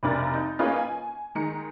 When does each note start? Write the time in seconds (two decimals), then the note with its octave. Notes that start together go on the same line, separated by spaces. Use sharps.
0.03 F1 B1 C3 D4 A#4 A6
0.34 D#4
0.59 A#3 C#4 F4 G#4 B4 D#5
0.76 G#5
1.35 D#3 G#3 A#5 C#7